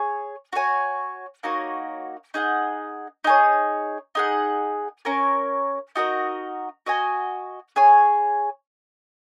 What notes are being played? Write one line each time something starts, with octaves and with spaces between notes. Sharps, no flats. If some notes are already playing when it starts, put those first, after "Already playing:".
Already playing: G#4 C#5
F#4 C#5 G#5
A#3 D#4 F#4 C#5
D#4 G#4 F#5
D#4 G#4 C#5
D#4 G#4 F#5
C#4 A#4 C#5
D#4 F#4 A#4 D#5
F#4 D#5 G#5
G#4 C#5 G#5